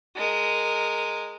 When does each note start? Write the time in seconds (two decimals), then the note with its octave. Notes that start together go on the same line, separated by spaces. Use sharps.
0.16 G#3 A#4